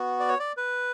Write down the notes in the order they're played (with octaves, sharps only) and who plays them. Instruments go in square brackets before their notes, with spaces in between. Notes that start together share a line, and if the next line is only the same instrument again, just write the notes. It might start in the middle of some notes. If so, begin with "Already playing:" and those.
Already playing: [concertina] B3 F#4
D5
C#5
D5
B4